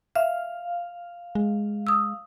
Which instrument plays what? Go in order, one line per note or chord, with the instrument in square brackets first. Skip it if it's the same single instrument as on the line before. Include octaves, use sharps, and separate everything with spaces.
[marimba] E5 [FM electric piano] F5
[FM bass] G#3
[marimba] D#6 E6